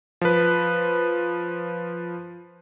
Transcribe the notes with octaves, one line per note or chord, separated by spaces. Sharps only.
F3 B4